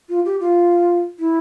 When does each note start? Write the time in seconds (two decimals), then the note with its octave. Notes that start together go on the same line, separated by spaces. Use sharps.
0.09 F4
0.25 G4
0.40 F4
1.19 E4